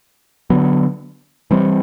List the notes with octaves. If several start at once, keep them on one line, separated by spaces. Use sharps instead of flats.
D3 F#3 B3
E3 G3 C4